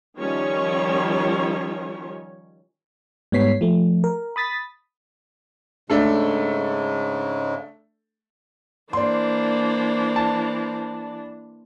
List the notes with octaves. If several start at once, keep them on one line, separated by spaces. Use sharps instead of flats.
D#3 F3 G3 C#4 C#5
G#2 G3 B3 C#5 B6 C7
F3 A3
A#4
B5 D#6 A6 B6
G#2 C#3 G#3 A3 D4 A4
E3 A#3 D4 C5 D5 C6
A5